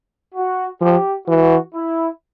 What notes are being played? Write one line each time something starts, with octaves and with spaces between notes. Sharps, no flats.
F#4
F3 G4
E3 F#4
E4